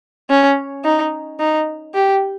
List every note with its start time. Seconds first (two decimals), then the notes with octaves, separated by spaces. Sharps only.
0.30 C#4
0.85 D#4
1.40 D#4
1.94 G4